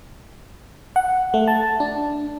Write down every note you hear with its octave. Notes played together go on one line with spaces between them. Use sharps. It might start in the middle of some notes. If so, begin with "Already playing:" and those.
F#5
A3
A5
D4